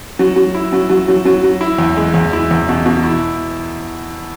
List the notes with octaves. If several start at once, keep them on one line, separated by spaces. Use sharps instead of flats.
F#3
F#3
E4
F#3
F#3
F#3
F#3
F#3
E4
E2
G#3
E2
E4
E2
B2
B2
E4